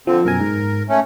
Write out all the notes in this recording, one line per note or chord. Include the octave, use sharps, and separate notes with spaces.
D3 F3 C4
F#2 B2 A#4 G#5
G#2
A3 C#4